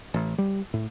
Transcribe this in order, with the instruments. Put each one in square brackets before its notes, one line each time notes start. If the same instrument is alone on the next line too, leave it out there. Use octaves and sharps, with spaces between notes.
[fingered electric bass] A1
G3
A2